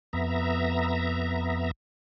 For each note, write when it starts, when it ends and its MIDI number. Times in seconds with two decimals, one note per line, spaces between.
0.13 1.71 41
0.13 1.71 59
0.13 1.71 76
0.13 1.71 82